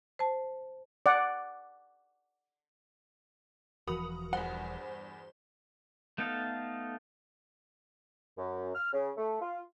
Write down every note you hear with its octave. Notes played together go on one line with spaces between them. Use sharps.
C5 A5
D5 F#5
E1 E3 F3 F#4 A#4 B5 D#6
E2 G2 C5 F#5
A3 B3 D#4 A4 F5
F#2
F6
C#3
A3
F4